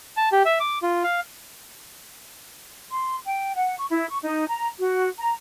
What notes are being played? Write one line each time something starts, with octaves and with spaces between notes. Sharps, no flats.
A5
G4
E5
D6
F4
F5
C6
G5
F#5
C#6
E4
C#6
D#4
A#5
F#4
A#5